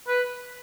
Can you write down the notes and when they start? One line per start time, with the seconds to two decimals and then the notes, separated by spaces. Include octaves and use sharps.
0.08 B4